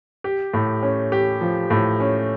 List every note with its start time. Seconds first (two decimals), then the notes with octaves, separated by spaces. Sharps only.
0.24 G4
0.53 A2
0.83 C#4
1.12 G4
1.41 F3
1.70 A2
2.00 C#4